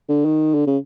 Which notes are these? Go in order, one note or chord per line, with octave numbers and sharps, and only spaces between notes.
D3
D#3
D3
C#3